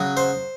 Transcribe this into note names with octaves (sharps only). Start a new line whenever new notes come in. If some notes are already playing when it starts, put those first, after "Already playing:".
Already playing: C#3 F#3
C5